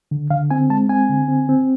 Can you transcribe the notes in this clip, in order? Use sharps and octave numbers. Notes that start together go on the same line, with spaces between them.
D3
D3 F5
C4 G#5
G#3 A5
C4 G#5
D3
C4
C4